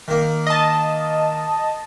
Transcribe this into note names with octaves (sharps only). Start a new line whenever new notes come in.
D#3 A#3
D#5 A5